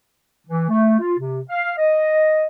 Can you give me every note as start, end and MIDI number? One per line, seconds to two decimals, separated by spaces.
0.47 0.68 52
0.70 0.99 57
0.99 1.13 65
1.19 1.40 48
1.49 1.72 77
1.78 2.47 75